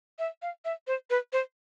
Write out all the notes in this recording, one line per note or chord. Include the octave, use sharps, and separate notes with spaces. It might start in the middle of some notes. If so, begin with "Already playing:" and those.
E5
F5
E5
C5
B4
C5